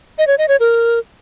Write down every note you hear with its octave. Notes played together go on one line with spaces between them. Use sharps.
D#5
C#5
D#5
C#5
A#4